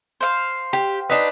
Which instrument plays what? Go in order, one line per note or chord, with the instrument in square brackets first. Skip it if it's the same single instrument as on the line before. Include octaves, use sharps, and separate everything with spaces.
[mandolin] C5 F5
[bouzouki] G4
D4 D#4 B4